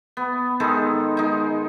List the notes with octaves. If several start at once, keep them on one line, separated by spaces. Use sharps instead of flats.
B3
D#3 G#3 D#4 A4
G#3 D#4